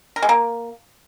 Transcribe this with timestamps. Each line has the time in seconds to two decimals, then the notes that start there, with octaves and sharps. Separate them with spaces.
0.16 A#4
0.22 G#3
0.29 A#3